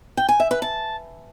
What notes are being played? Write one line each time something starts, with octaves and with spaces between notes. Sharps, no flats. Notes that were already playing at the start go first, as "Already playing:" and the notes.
G5
G#5
E5
B4
A5